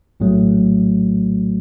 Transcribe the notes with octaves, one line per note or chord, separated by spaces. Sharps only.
A#1 A2 F#3 A3